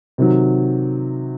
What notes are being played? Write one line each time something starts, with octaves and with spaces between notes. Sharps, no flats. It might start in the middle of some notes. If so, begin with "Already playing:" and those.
C3 D#3 F#3